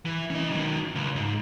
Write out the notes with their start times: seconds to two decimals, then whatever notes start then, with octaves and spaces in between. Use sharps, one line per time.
0.06 E3
0.30 C#4 D#5
0.50 D#3 F#3
0.95 C#2
1.16 G#2